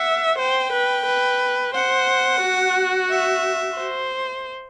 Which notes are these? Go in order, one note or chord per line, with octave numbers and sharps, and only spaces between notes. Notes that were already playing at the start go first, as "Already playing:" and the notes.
Already playing: E5 F#5
C5 G5
B4
B4
C5 F#5
F#4
E5
C5